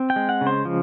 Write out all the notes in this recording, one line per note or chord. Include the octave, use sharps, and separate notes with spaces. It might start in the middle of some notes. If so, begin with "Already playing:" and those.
Already playing: C4
G5
G#3
F#5
C#3
C5
F3